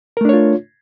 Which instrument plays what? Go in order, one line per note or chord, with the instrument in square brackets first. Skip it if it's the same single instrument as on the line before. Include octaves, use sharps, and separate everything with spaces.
[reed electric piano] A#4
A3
D4
C#5
F4